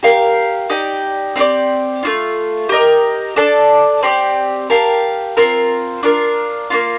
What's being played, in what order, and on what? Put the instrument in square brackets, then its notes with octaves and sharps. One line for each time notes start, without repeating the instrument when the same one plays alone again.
[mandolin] G4 A#4 F5
D#4 G4 D5 G5
C4 D#4 G4 D5
A3 D4 F4
G4 A#4 D#5
D4 A4 D5 A5
C4 G4 D5
G4 A#4 F5 A5
C4 F4 A#4
D4 F4 A#4
A#3 D4 F4